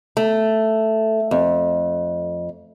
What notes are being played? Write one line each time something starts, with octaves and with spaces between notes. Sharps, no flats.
A3
F2